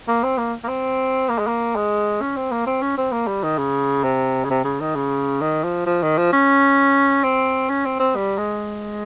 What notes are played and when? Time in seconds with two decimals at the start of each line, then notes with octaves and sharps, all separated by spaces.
0.08 A#3
0.24 C4
0.38 A#3
0.64 A#3
0.68 C4
1.29 A#3
1.38 G#3
1.47 A#3
1.76 G#3
2.21 C#4
2.36 C4
2.51 A#3
2.67 C4
2.82 C#4
2.97 C4
3.12 A#3
3.27 G3
3.43 D#3
3.58 C#3
4.04 C3
4.45 C#3
4.50 C3
4.64 C#3
4.81 D#3
4.96 C#3
5.41 D#3
5.64 F3
5.86 F3
6.03 D#3
6.18 F3
6.33 C#4
7.24 C4
7.70 C#4
7.85 C4
8.00 C4
8.16 G3
8.38 G#3